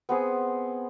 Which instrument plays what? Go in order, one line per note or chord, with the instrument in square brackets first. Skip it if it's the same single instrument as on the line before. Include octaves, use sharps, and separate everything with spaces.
[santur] B3 C4 G#4